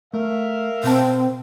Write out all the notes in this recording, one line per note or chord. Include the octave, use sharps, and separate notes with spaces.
A3 A#4 E5 F5
B2 C4 A5